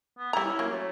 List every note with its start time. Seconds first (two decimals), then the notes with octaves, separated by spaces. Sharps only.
0.18 B3
0.33 G3 E4 A#5
0.45 C#4 E4
0.59 F#3 A#3
0.71 A3 C#5